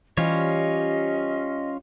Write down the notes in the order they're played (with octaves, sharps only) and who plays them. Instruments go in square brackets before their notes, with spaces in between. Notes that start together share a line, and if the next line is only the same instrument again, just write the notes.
[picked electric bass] E3 [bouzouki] G3 G4 C5 [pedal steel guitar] C#4 F4 C#5 [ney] D#5